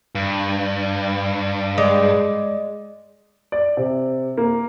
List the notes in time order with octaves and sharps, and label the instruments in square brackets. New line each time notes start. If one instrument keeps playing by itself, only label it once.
[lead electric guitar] G2
[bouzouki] G#3 D5
[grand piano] D5
C3
A#3